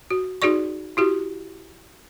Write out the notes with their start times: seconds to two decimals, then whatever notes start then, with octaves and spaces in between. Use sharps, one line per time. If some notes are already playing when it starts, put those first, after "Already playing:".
0.11 F#4
0.42 D#4 F#4 G#4 D5 C#6
0.97 E4 F#4 G4